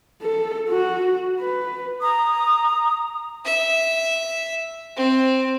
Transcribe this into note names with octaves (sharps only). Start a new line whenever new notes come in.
A4
F#4
B4
A#5 D#6
E5
C4